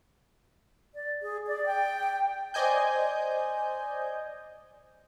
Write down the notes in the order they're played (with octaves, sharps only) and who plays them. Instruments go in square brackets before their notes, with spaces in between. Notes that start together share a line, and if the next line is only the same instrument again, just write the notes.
[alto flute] D5
G#4
D5
G5
[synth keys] C5 D5 D#5 G#5 G6